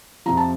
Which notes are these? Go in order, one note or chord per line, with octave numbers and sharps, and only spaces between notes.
F2 C3 F3 A#5
A5